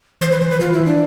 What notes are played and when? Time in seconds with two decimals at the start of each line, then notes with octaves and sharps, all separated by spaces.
0.21 E3 C5
0.32 B4
0.41 E3 C5
0.51 B4
0.60 E3 F4
0.73 E4
0.80 E3
0.86 D4